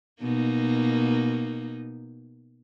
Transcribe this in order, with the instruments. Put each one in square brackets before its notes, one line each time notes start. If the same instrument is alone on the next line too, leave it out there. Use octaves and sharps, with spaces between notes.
[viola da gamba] B2 A#3 D#4